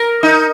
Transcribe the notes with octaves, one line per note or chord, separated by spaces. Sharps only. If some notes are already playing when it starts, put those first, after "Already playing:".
Already playing: A#4
D#4